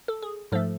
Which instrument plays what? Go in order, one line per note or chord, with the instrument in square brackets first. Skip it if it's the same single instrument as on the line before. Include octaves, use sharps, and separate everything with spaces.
[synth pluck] A4
G#4
G#2 F3 A3 A4